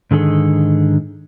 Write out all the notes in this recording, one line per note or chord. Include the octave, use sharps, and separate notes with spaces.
G#2 D3 D#3 G#4 A4